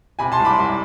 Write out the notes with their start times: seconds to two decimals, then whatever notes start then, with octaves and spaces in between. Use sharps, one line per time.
0.19 C3 G#5 B5
0.32 A5 C6
0.39 C2
0.45 B5 D6
0.58 C2